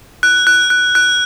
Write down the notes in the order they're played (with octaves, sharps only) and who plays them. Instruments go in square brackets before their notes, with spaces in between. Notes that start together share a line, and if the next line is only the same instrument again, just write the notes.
[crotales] F#6
F#6
F#6
F#6